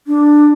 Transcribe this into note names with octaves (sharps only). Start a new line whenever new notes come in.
D4